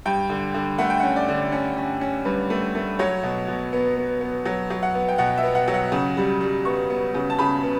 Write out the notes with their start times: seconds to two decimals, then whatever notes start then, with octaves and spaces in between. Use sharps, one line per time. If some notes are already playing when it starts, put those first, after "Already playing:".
0.06 G2 G5
0.29 D3
0.54 D3
0.78 A3 F#5
0.90 G5
1.00 F#5
1.03 C#4
1.16 D5
1.28 D3
1.52 C#4
1.77 C#4
2.01 C#4
2.25 G2 B4
2.50 A3
2.75 A3
2.99 F#3 C#5
3.23 B2
3.48 B2
3.73 B3
3.96 B3
4.21 B3
4.46 F#3
4.70 F#3
4.83 F#5
4.95 B3
5.08 G5
5.18 B2 F#5
5.38 E5
5.43 B3
5.55 F#5
5.68 F#3
5.74 F#5
5.92 C#3
6.17 G3
6.41 G3
6.65 B3 C#6
6.90 B3
7.14 C#3
7.30 A5
7.39 C#3 B5
7.63 B3